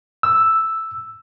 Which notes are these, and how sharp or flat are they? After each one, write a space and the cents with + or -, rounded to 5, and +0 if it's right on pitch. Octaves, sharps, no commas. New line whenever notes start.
E6 +0